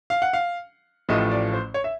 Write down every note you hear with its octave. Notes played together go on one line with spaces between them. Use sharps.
F5
F#5
F5
A1 A2 F3 A3 D#5
D5
C5
C#5
E5